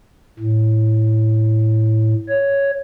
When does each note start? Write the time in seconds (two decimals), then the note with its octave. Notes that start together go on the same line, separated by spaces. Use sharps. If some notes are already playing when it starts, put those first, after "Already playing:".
0.39 A2
2.28 C#5